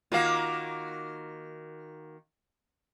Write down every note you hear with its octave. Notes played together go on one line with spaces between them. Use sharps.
D#3 A#3 F4 F#4 F5